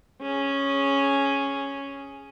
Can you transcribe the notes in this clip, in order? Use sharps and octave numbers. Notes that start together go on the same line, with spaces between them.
C#4 G#4